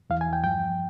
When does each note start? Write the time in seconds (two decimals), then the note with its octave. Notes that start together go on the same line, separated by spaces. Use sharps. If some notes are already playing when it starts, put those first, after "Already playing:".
0.10 E2 E3 F5
0.21 G#5
0.33 G5
0.44 G2 F3 G5